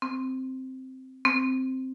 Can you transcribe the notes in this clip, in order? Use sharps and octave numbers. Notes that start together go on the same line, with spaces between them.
C4
C4